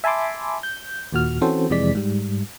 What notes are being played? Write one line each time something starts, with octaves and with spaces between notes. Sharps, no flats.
E5 G#5 A5 B5 C6 D6
G6
D#2 A#2 F#4 F6
E3 C4 C#4 F#4 A4 C5
F2 C3 E3 G#3 D5 B6
G#2 G3